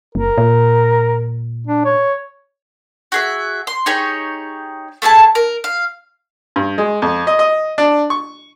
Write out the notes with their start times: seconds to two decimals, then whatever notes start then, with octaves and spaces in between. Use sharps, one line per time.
0.15 F#1 A#4
0.38 A#2
1.67 D4
1.85 C#5
3.12 F#4 G#4 E5
3.67 C6
3.86 D#4 G4 G#4 C#5
5.02 A3 E4 G#4 A5
5.35 A#4
5.64 F5
6.56 G2
6.78 G#3
7.02 F2
7.27 D#5
7.39 D#5
7.78 D4
8.10 C#6